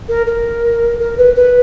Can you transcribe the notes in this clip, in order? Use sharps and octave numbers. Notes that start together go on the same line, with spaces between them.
A#4
A#4
A#4
B4
B4